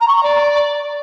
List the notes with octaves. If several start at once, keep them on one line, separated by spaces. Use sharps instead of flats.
A#5
C#6
A#5
D5